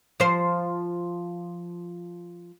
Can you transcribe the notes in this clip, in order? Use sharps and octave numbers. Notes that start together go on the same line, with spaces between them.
F3 C5